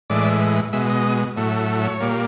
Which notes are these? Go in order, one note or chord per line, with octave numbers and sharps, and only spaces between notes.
A2 E3 G#3 D5
B2 G#3 E5
D#5
A2 F#3 A3
C#5
A#2 G3 A#3